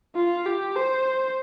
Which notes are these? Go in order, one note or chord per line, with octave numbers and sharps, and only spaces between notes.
F4
G4
C5